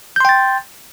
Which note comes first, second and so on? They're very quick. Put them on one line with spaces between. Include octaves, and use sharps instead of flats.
G6 C6 G5 A6